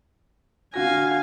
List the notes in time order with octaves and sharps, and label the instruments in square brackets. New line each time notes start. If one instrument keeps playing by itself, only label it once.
[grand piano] D3 F#4 A#6 [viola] F5 G#5